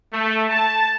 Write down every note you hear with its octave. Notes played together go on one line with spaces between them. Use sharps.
A3
A5